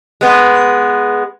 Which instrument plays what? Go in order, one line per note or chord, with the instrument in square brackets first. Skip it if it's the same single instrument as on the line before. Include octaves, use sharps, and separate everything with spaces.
[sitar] G#3 B3